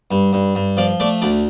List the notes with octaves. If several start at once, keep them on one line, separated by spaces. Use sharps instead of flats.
G2
G2
G2
F3 D5
A3 D5
D2 D5